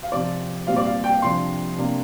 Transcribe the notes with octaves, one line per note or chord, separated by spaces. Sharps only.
F5
C3 F3 C4 F4 D5
A#2 G3 C4 F4 F5
D5
F5
G5
C3 F3 D4 C6
C3 A#3 D4